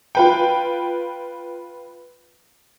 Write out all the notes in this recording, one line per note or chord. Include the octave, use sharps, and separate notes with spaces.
F4 B4 G5